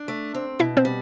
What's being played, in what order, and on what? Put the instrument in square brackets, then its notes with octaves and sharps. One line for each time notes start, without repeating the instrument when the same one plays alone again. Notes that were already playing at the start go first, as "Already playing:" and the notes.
Already playing: [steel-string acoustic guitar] D4
A3
C4
[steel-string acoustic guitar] B2 [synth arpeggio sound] E4 E5
[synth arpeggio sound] C4 C5
[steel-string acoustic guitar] G3